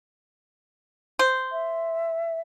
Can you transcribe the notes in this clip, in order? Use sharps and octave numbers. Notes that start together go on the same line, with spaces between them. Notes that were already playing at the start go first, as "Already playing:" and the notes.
C5
E5